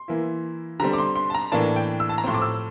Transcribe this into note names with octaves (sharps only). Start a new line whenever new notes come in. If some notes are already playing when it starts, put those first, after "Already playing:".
Already playing: C6
E3 A#3 E4
D3 G3 C4 A#5
D6
C6
C6
A5
A#5
A2 E3 A#3 D4 A5
G5
E6
A5
A#5
A2 F3 C4 C6
D6
E6